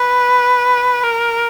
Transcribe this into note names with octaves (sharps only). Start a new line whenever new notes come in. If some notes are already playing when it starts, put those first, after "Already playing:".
Already playing: B4
A#4